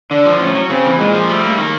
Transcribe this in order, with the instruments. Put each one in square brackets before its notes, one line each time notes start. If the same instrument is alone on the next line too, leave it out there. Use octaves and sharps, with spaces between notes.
[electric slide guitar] D3 [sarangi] D4
[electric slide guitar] F3
[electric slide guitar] A2 [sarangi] C#4
[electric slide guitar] F#3
[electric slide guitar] C#3 [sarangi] C4
[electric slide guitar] E3
[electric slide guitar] A#2 [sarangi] G#3
[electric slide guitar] F3
[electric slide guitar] G3 [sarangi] A3
[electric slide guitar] A#3
D#3